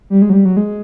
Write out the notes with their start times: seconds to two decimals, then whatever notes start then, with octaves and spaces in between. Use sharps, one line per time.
0.10 G3
0.22 G#3
0.30 F#3
0.33 G3
0.45 F#3
0.57 G#3